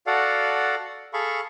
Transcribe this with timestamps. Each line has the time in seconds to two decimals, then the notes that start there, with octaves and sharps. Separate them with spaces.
0.07 F#4 A4 D5 F5 F#5
1.13 G#4 A4 F5 B5 C#6